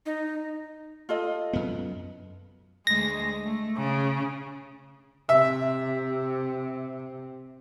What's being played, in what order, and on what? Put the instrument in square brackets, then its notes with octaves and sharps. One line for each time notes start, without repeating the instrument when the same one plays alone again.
[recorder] D#4
[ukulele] F4 A4 D#5
[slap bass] F#2 B3
[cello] D2 G#3 [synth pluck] A#6
[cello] A3
C#3
[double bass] C3 [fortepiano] E5